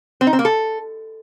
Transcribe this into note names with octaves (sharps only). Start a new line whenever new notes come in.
C4
D#4
C4
A#3
A4